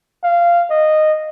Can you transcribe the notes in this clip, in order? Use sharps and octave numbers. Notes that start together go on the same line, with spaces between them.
F5
D#5